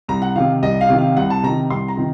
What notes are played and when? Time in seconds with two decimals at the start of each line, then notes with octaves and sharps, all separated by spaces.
0.08 C2 A#5
0.22 F#5
0.36 C3 D#3 F5
0.62 C2 D#5
0.81 F5
0.89 C3 D#3
0.98 F5
1.17 C2 F#5
1.30 A5
1.43 C3 D#3 A#5
1.70 C2 C6
1.88 A#5
1.97 C3 D#3